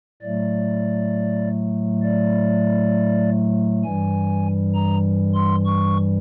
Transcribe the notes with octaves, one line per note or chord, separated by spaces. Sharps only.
A2 F#3 A3 D5
D5
G2 E3 G3 G#5
A#5
C6
C#6